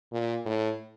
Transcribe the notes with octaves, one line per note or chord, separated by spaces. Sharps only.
A#2
A2